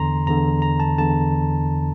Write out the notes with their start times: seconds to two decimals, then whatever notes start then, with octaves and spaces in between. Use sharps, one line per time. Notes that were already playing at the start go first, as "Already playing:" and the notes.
Already playing: E2 D3 A#5 C6
0.27 E2 D3 A#5
0.62 A#5
0.80 A5
0.98 E2 D3 A5